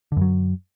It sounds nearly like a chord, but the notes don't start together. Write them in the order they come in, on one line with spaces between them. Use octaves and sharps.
D3 F#2 F#3